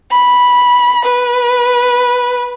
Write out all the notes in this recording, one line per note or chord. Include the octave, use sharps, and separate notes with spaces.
B5
B4